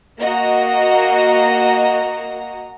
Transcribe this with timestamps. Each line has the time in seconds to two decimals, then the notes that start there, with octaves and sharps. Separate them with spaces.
0.19 A#3 F#4 D#5 A#5